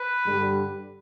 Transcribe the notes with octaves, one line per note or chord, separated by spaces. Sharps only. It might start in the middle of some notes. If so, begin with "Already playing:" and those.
Already playing: B4
G2 D3 G3